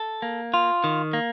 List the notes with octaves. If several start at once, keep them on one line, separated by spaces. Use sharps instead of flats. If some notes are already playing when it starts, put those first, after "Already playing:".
Already playing: A4
A#3
F4
D#3
A#3